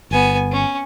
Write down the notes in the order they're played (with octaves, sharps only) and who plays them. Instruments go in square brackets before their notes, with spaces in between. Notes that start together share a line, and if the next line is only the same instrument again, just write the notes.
[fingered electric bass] G1 [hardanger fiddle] B3 G#5
[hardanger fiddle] C#4